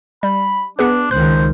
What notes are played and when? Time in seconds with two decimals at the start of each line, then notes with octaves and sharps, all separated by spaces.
0.23 G3 B5
0.79 B3 D4 G#4 B4
1.11 C#2 D#3 C5 F#6